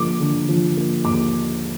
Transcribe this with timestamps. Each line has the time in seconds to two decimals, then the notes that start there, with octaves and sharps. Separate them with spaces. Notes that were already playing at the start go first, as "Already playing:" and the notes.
Already playing: D3 F3 A#3 D6
0.20 D3
0.49 F3
0.77 A#3
1.05 D#2 D6